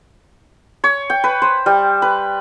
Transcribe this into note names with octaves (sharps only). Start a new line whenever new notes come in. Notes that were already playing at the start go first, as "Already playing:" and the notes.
C#5
G5
B4
C5
G3
B4